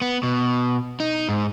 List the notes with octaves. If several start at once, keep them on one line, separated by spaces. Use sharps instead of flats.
B3
B2
D#4
G#2